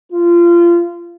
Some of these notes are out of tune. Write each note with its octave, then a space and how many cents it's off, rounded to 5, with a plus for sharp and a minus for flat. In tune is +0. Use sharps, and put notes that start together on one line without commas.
F4 -25